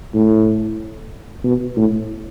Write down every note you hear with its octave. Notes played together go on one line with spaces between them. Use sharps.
A2
B2
A2